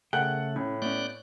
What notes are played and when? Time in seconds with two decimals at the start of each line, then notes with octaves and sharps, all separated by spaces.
0.13 C#3 A3 G#4 A#4 F#5 G5 F#6
0.56 A2 C#4
0.82 A3 B3 C#4 D5 F#6 G6